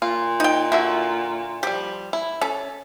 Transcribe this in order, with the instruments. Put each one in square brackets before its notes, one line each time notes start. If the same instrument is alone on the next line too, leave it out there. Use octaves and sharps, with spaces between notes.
[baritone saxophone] A#2 [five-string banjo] F4
[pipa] D#4 G5
[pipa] D3 [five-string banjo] E4 F#4 E5
[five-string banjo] F3 G3 [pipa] G4
[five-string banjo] E4
[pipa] C#4 [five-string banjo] A4